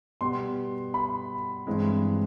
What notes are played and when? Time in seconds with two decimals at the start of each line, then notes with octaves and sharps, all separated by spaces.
0.21 B2 G3 B3 C6
0.94 B5
1.67 G2 E3 G#3 C4